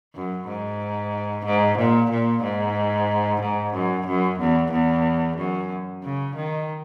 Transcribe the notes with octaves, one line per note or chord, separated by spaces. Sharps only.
F#2
G#2
G#2
A#2
A#2
G#2
G#2
F#2
F#2
E2
E2
F#2
C#3
D#3